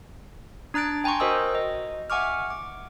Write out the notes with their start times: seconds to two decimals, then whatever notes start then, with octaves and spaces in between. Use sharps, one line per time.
0.74 D4 A#5 F#6 A6 D7
1.04 G5 G#5 A#5 C6 C#6
1.20 F#4 A#4 C5 D#5 D#6 E6
1.55 D#5
2.10 E5 F#5 G#5 C#6 D6 F6
2.50 D6